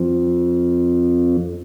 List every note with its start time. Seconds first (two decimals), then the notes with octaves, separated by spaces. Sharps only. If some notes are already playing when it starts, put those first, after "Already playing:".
Already playing: F2